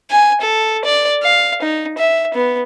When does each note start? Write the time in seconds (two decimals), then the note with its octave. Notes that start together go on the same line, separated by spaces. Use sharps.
0.10 G#5
0.41 A4
0.85 D5
1.23 F5
1.62 D#4
1.98 E5
2.34 B3